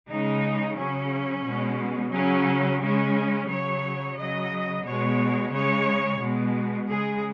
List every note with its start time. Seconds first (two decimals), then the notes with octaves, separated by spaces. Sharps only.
0.09 C#3 G#3 D#4
0.77 C#3 F#3 C#4
1.45 B2 G#3
2.12 C#3 F#3 C#4
2.80 C#3 G#3 C#4
3.48 C#3 F#3 C#5
4.16 C#3 F#3 D#5
4.84 B2 G#3 C#5
5.51 C#3 G#3 C#5
6.19 B2 G#3
6.87 C#3 G#3 G#4